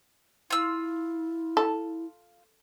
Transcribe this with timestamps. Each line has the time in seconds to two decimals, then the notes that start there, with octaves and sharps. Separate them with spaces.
0.50 E4 F4 E6
1.57 A4